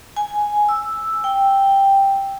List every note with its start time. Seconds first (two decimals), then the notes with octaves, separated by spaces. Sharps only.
0.17 G#5
0.69 E6
1.24 G5